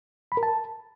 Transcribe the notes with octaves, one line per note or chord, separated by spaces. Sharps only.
B5
A#4
A5